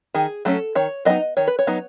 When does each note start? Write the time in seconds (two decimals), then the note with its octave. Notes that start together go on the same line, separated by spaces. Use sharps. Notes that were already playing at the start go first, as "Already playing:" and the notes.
0.14 D#3 G#4
0.45 F#3 A3 C#4 A4
0.75 D#3 C#5
1.05 F#3 B3 D#4 D#5
1.37 D#3 C#5
1.47 B4
1.59 C#5
1.67 F#3 B3 D#4